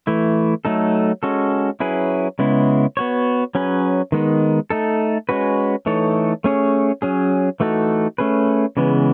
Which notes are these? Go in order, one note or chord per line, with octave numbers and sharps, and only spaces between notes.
E3 A3 E4
F#3 A3 D#4 A4
G#3 C#4 F#4 A4
F#3 C#4 E4 G#4 B4
C#3 G#3 B3 E4
B3 F#4 C#5
F#3 C#4 G#4 B4
D#3 G#3 B3 D#4
A3 D#4 A4
G#3 C#4 F#4 B4
E3 A3 D#4 A4 C#5
A3 C#4 G#4 C#5
F#3 C#4 G#4
E3 A3 D#4 F#4 A4
A3 C#4 G#4 B4
C#3 E3 G#3 B3